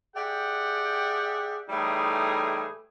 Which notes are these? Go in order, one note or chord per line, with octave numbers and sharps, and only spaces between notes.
G4 G#4 D5 E5 F#5 G5
A2 E3 G3 A3 D#4 G#4